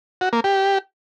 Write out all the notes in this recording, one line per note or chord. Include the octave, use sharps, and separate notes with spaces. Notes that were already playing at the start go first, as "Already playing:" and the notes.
F#4
A#3
G4